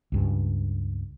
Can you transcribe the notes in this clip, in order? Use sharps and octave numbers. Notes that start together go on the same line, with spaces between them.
C#2 G2